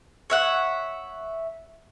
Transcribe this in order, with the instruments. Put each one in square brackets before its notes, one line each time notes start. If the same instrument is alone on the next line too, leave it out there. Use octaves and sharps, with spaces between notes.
[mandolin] C#5 E5 F#5